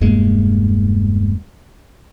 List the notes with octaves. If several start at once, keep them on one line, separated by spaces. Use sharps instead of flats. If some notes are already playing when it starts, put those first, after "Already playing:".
E1 G2 G#3 A#3